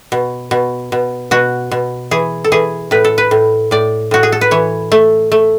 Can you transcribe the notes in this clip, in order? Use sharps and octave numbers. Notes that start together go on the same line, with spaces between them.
B2
B2
B2
B2 F#4
B2
E3 G#4
A4
E3 G#4
A2 B4
A4
B4
A2
A2 D5
A2 F#4
G#4
A4
B4
E3 C#5
A3
A3